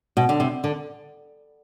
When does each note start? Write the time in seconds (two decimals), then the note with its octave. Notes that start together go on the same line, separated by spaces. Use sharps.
0.17 B2
0.29 D3
0.40 C3
0.64 D3